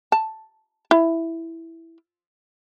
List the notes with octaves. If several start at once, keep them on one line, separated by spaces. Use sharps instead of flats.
A5
E4